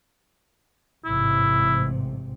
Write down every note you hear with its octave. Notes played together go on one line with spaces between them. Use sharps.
A1 G#2 C3 E4